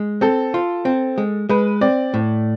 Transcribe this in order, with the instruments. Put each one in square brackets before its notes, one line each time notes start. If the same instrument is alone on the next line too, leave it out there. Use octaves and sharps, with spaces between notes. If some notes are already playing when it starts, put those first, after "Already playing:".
Already playing: [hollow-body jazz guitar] G#3
[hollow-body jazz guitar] C4 [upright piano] A4
[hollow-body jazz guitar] F4
C4
G#3
[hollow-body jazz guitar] G#3 [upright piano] B4
[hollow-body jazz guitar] C4 [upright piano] D5
[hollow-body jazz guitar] A2